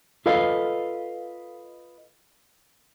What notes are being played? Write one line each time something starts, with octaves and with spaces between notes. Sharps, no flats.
F4 A4 B4 D#5 F5